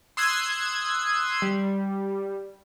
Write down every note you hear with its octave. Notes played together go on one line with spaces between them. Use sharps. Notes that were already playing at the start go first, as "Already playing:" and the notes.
C6 D#6 E6 F#6 G#6
G3